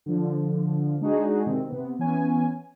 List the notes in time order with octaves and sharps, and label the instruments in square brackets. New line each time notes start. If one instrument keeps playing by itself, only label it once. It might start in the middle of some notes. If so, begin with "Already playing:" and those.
[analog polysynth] D3 F3
G#3 D4 D#4 F#4 G#4
C3 D#3 C4
C3 B3
E3 B3 C#4 G#5